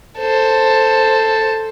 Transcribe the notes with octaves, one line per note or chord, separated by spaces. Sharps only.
A4 C5